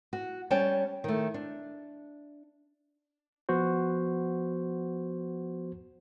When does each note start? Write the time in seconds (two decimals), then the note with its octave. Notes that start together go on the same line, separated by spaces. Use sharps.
0.13 F#4
0.50 G3 C#4 C#5 G5 A5
1.04 D#3 A3
1.34 D4
3.49 F3 B3 F#4 C5